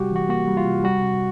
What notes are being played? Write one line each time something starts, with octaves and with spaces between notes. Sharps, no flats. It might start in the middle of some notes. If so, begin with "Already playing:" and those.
Already playing: C3 G3 F#4 G4
E3 F#4
A#3 F#4
G3
F4
C3
G3 F#4
C3